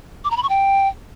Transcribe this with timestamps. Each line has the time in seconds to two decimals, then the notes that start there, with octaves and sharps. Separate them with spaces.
0.24 D6
0.31 A#5
0.37 B5
0.43 C#6
0.49 G5